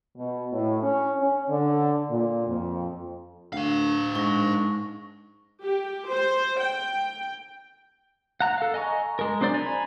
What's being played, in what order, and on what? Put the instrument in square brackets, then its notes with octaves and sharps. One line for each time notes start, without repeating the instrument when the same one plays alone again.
[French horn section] B2
A2
C#4
C#4
D3
A#2
F2
[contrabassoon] D2 [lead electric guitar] D4 F5
[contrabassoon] G#2 [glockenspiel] C#6 A#6
[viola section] G4
C5
G5
[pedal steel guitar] F#5 A#5 F#6
A4 F5
D#5 G#5 A#5 C#6
G#3 A#4
F#3 C4 D4 C5 D5
G#5 A#5 B5